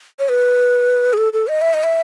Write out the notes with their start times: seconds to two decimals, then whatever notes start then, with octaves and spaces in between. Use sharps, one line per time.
0.19 C#5
0.29 B4
1.13 G#4
1.17 A4
1.33 A4
1.48 D#5
1.61 E5
1.74 D#5
1.83 E5